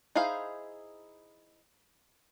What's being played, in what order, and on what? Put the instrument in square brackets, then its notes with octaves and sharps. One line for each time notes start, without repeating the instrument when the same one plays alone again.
[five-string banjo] D#4 E4 G#4 C5 F5